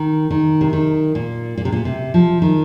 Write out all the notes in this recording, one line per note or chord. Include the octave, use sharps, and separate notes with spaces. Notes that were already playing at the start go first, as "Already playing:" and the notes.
Already playing: D#3
D#3
C3
D#3
A#2
A#2
C3
A#2
C3
F3
D#3